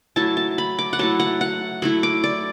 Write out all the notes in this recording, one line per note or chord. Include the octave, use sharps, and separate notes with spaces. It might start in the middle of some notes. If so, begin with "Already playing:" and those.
F#3 A3 E4 A5
A5
B5
D6
F#5
F#3 A3 E4 A5
F#5
F#5
F#3 A3 E4 B5
D6
D5